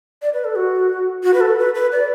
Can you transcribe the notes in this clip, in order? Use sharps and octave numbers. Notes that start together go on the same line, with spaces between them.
D5
B4
A4
F#4
F#4
B4
A4
B4
B4
D5